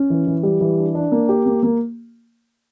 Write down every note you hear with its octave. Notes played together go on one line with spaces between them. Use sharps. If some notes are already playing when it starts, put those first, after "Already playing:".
Already playing: C#4
E3
E3
G3
E3
D4
D4
A#3
G4
A#3
A#3